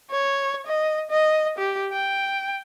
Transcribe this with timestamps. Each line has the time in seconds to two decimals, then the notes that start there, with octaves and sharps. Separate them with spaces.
0.11 C#5
0.67 D#5
1.11 D#5
1.58 G4
1.93 G5